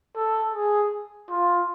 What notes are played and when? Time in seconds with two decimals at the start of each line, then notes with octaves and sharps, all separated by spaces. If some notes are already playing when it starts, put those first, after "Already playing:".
0.16 A4
0.54 G#4
1.29 F4